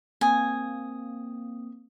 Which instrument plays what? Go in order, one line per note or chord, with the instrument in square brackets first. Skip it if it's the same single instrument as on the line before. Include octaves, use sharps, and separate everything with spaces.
[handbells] A#3 C4 D#6 [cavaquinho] G#5